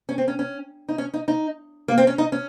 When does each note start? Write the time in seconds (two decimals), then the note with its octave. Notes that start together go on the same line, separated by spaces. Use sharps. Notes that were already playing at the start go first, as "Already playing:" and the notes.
0.09 C#4
0.18 C4
0.28 C#4
0.39 C#4
0.89 D#4
0.98 C#4
1.14 D#4
1.28 D#4
1.88 A#3
1.98 C4
2.07 C#4
2.18 D#4
2.32 C#4